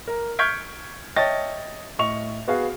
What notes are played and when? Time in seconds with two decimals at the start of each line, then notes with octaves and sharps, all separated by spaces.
0.07 A#4
0.39 C#6 F6 G6 G#6 B6 D7
1.16 C#5 D#5 E5 G5 A5 A6
1.99 A2 D#5 C#6 F7
2.48 B3 F#4 G#4 F5